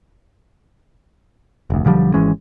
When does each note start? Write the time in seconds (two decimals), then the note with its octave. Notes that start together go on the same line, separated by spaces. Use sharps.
1.70 F1 D2
1.85 B1 D3 F3 G3
2.14 G#1 E3 G#3 C#4